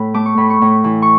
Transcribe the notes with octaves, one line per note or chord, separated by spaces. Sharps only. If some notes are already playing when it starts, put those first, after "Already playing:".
Already playing: A2 B5
A3 D6
C#6
A2 B5
C#6
A2
E3
C#6